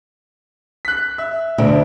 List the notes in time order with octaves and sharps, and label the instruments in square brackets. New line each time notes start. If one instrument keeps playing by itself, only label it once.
[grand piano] F#6 B6
E5
[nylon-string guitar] D2 B2 D4 [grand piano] E5